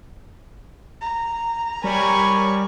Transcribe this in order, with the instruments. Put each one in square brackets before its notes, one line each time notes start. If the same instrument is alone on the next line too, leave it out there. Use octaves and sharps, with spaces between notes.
[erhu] A#5
[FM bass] G3 [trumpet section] A#4 C#5 B5 [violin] G#5 C#6